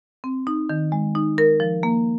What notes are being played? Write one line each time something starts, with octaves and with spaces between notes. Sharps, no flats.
C4
D#4
D#3
G#3
D#4
A#4
F3
A#3